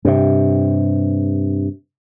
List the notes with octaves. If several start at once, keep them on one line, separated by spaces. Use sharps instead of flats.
G2 C3